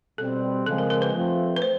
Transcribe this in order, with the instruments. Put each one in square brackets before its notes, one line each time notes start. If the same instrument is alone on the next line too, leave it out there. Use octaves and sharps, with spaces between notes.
[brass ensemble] B2 G3 C4 [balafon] A4
[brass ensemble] C#3 F3 G#3 C4 [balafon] A4
[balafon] A#4
A#4
B4
[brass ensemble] F3 A3 C4 F4
[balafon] B4
C5